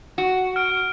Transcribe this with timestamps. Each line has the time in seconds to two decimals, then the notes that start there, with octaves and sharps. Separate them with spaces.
0.18 F#4
0.56 F6 D7